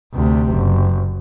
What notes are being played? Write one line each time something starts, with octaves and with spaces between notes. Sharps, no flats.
D2 C3
F#1